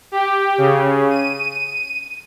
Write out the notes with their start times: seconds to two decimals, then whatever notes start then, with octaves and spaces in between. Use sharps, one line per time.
0.12 G4
0.58 C#3
1.10 D#7